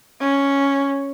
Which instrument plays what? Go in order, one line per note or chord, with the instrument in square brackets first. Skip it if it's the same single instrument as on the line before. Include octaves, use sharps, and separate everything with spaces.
[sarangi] C#4